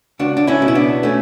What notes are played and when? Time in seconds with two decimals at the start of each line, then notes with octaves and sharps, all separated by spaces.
0.19 C#2 D4 F#4
0.37 D4
0.47 C#4 E4
0.62 B2
0.68 E4
0.75 B3 D4
1.03 A3 C#4